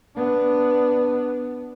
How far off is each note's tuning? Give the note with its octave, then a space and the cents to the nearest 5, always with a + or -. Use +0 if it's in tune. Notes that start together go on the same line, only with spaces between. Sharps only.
B3 +0 D4 +0